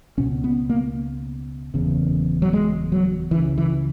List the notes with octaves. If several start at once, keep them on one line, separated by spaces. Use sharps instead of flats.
C#2 B2 C#4
B3
A#3
F#1 E2 C#3
F#3
G#3
F#3
C#2 C#3 E3
E3